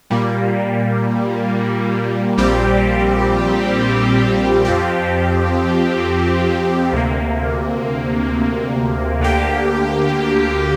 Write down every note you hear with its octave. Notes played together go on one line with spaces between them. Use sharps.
A#2 G3 A#3
A#1 A#2 G3 C4 G4
F2 F3 C4 G4
D2 C3 A#3
D2 D3 A#3 G4